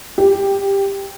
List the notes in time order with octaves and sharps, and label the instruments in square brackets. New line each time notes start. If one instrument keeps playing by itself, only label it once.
[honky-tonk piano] G4